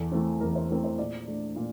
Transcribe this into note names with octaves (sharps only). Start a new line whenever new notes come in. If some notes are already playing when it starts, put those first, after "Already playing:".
Already playing: E2 A4
E3 A3 C4
E2 A#4
C5
E3 A3 C4 A#4
C5
A#2 D5
A3 D4
A#2